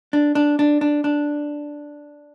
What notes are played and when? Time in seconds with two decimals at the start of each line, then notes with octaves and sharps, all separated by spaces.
0.13 D4
0.35 D4
0.59 D4
0.81 D4
1.04 D4